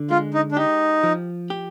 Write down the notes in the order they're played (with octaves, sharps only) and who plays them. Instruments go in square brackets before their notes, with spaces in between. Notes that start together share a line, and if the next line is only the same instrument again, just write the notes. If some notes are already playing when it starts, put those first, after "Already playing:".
Already playing: [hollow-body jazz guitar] D3
[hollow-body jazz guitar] G#3 [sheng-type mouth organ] F4
[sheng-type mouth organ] D#4
D4
[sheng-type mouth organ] D#4 [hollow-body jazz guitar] G4
[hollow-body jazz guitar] F3
G4